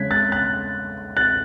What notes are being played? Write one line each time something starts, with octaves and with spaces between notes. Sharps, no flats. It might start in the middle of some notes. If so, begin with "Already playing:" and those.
Already playing: C#3 G#3 C#4 F#6 G#6 B6
F#6 A6
F#6 A6
F#6 A6